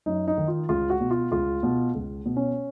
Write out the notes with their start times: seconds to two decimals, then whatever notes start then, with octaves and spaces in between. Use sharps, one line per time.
0.06 F#2 D#4
0.28 D#4
0.38 D#3
0.48 F4
0.69 C#2 F4
0.90 F#4
1.01 B2
1.11 F4
1.31 C#2 F4
1.63 B2
1.95 C#2
2.26 B2
2.36 C#4